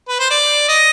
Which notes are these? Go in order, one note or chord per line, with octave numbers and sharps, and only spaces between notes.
B4
C5
D5
D#5